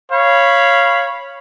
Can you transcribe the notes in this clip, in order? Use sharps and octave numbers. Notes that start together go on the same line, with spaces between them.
C#5 F5 B5